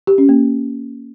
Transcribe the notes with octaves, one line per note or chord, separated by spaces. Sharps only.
G4
C#4
A#3